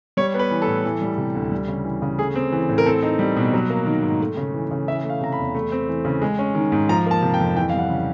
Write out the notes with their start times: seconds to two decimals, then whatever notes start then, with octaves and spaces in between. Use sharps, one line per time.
0.17 G3 C#5
0.34 B3
0.39 B4
0.51 E3
0.62 A4
0.67 A2
0.85 E3
1.01 G3
1.18 C3
1.35 D2
1.52 G3
1.68 C#3
1.85 E3
2.02 C#3
2.18 A3 G#4
2.36 C4
2.52 E3
2.69 A2
2.78 A#4
2.86 C4 A4
3.02 D#4
3.19 G3
3.36 B2
3.54 F#3
3.70 A#3
3.86 D#3
4.03 G#2
4.20 A3
4.37 C#3
4.54 E3
4.71 C#3
4.87 E3 E5
5.04 A3
5.09 F5
5.21 C3 A#5
5.32 B5
5.38 E2
5.54 A3
5.72 C4
5.89 E3
6.05 C#3
6.22 G#3
6.39 C#4
6.55 D#3
6.72 G#2
6.89 F3 A#5
7.06 A#3 A5
7.22 C3
7.34 G5
7.40 F2
7.56 E3 G5
7.69 G3 F5
7.79 F#5
7.90 C#3